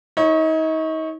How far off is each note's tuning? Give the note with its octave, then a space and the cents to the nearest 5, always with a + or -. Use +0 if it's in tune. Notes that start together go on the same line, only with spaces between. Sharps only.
D#4 +35 C#5 -10